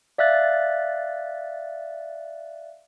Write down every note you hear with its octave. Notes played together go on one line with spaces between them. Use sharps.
D5 E5 F5 F#6 A6